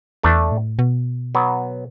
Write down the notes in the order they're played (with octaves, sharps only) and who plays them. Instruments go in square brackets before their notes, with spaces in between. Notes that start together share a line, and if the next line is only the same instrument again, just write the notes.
[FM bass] E2 [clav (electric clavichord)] A3 D4
[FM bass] A2
B2
[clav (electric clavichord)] F#3 B3